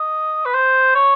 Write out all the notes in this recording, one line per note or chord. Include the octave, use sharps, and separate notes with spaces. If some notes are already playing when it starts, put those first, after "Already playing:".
Already playing: D#5
B4
C5
C#5